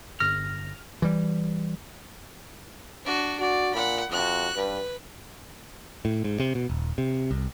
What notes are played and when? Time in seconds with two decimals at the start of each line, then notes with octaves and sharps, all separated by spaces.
0.20 G1 F6 A#6
1.02 E3 G3
3.04 D4 F#4
3.40 F#4 D5
3.75 A#2 F#5 B5
4.11 F2 F#4 F#6
4.57 G2 B4
6.05 A2
6.24 G#2
6.40 C3
6.55 B2
6.70 D#1
6.98 C3
7.31 C2